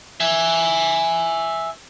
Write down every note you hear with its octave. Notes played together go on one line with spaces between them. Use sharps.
E5 G#5